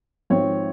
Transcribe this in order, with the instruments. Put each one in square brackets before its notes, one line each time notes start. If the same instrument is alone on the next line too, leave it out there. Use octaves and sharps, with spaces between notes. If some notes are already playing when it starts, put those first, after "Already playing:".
[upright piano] G#1 G#2 F3 C4 C#5